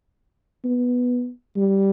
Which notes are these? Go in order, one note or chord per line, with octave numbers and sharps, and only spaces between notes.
B3
G3